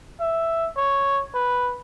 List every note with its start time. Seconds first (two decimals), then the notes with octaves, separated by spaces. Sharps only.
0.20 E5
0.77 C#5
1.35 B4